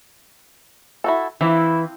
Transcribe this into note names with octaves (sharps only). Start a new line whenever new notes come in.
E4 F#4 A4
E3 F3 C4 E4